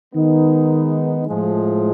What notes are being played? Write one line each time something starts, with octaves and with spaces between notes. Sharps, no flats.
D#3 G#3 B3 D#4
A2 F3 G#3